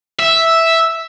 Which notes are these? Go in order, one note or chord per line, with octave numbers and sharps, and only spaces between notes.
E5